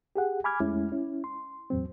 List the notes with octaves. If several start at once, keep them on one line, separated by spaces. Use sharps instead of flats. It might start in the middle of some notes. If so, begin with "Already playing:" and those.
G4 G#4 F#5
G#5 B5 D6 F6 G#6
E2 G#3 A3 C#4 E4
C#4 E4
C6
E2 A2 F#3 C4